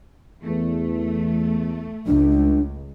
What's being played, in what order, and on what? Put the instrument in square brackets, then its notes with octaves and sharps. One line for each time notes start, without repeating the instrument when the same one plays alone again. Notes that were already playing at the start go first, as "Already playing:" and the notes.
[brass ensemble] E2 [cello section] A3
[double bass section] C#2 [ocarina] D4